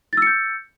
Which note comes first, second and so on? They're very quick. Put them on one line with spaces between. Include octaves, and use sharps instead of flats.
A6 E6 C#7 G6